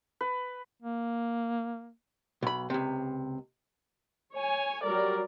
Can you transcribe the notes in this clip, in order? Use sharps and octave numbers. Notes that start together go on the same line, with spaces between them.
B4
A#3
B1 B5
C#2 C3
C#5 G#5
F#3 G3 A#4 D5